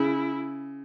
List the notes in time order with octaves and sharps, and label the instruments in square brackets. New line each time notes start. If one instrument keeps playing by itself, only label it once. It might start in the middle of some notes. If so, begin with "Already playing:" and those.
Already playing: [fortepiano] C#3 [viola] E4